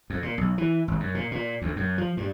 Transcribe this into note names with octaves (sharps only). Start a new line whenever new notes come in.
F2
A#2
B1
E3
G#1
F#2
A#2
A#2
D2
F#2
F3
G2